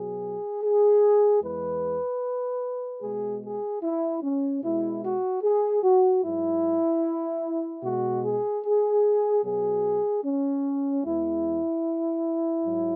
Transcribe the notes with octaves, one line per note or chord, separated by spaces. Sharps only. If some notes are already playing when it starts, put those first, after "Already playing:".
Already playing: B2 F#3 G#4
G#4
E2 E3 G#3 B4
B2 G#3 G#4
G#4
E4
C#4
B2 G#3 E4
F#4
G#4
F#4
G#2 F#3 E4
B2 G#3 F#4
G#4
G#4
B2 F#3 G#4
C#4
E2 E3 G#3 E4
G#2 F#3